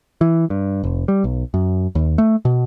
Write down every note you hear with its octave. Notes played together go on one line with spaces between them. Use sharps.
E3
G2
F1
G3
B1
F#2
D#2
A3
B2